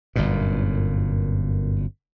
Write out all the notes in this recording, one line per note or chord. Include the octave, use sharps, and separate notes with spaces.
G1 F#2 A#2